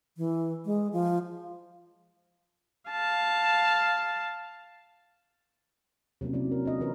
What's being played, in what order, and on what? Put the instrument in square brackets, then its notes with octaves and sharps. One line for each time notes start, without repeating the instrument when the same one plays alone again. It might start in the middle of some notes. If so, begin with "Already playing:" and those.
[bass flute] E3
G#3
F3
[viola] F5 A5
[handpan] C3 F#3 A#3 C#4
F#3 B3 C#4 D#4 E4 D5
A#4
D4 F4 A4 D#5
E3 A#3 D4 A#4 B4 C#5